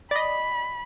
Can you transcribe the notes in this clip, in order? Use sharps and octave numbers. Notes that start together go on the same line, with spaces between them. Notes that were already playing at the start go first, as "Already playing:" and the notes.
D5 D#5 B5